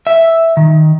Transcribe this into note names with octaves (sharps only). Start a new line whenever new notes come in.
E5
D#3